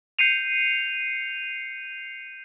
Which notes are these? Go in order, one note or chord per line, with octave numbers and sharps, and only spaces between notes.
G6 C7 C#7 D#7 F7